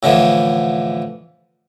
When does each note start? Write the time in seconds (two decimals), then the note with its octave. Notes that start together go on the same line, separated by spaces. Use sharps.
0.03 A2 D3 E3 F3